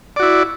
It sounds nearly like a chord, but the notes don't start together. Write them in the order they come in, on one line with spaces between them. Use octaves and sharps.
D5 F#4 E4